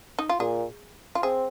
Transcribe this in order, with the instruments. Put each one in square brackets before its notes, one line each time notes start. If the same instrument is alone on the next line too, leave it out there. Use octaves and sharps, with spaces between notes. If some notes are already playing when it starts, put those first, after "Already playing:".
[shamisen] D#4
F4
[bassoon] A#2 [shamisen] G#4
[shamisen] F4
[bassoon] C4 [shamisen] G#4